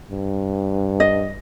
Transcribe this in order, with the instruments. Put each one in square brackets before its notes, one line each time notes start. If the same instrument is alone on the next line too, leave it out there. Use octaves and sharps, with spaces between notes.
[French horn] G2
[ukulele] D#5